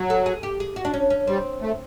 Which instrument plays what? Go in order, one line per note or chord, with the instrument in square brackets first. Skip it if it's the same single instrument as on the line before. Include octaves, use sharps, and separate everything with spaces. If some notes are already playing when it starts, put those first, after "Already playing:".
Already playing: [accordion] F#3
[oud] A4
G#4
G4
G#4
F#4
D4
C#4
C#4
[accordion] G3 [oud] C4
[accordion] A3